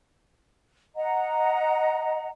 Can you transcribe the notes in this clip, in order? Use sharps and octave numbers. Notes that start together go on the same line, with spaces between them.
D#5 F#5 A#5